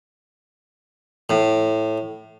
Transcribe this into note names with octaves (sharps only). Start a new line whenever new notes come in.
A2